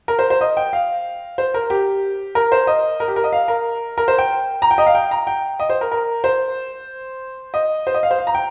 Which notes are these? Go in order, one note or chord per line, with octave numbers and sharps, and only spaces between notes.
A#4
C5
C5
D#5
G5
F5
C5
A#4
G4
A#4
C5
D#5
A#4
G4
A#4
D#5
F5
A#4
A#4
C5
G5
A#5
G5
D#5
F5
G5
A#5
G5
D#5
C5
A#4
A#4
C5
D#5
C5
D#5
F5
C5
F5
A#5
G5